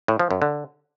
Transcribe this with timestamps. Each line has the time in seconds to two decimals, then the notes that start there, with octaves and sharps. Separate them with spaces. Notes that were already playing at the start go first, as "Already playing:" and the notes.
0.08 A2
0.19 F3
0.31 F#2
0.42 D3